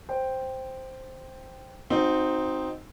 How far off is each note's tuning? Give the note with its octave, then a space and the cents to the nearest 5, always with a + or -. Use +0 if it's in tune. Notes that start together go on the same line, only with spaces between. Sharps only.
C5 +0 G5 +0
C4 +0 D#4 +0 F#4 -25